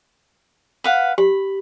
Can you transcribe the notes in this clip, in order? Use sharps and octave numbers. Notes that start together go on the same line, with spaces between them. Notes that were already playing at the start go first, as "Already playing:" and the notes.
B4 F5 F#5
G4 B5